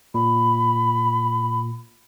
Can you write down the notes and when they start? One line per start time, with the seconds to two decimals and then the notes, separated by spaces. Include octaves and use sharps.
0.14 A#2 B5